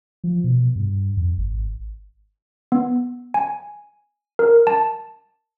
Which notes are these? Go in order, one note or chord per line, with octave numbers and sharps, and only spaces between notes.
F3
B2
G2
F2
G#1
B3
G#5
A#4
A5